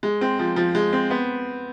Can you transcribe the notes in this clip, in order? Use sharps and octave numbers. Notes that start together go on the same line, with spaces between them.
G#3
C4
F3
F3
G#3
C4
B3